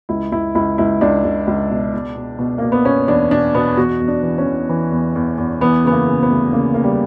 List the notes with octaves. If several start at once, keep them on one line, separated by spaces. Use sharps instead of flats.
C#2 E4
C#2 E4
C#2 E4
C#2 E4
C#2 D4
C#2
C#2
B2
B2
B2
B2
B2 A#3
B3
B2 C#4
E2 D4
B2 D4
B2 B3
E2 F#4
E2
D4
E3
C#4
E3
E3
E2
E2
E2
E3 B3
C#3 B3
A#3
C#3
B3
D2
C#3 A#3
C#3 A#3
G3